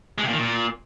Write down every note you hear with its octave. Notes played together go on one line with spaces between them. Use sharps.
G#3
C3
A#2
D#3
A#2